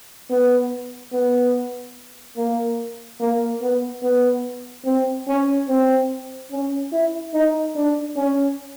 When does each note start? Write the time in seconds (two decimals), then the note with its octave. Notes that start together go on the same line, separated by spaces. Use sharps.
0.30 B3
1.13 B3
2.37 A#3
3.20 A#3
3.61 B3
4.03 B3
4.85 C4
5.28 C#4
5.69 C4
6.52 C#4
6.92 E4
7.34 D#4
7.75 D4
8.16 C#4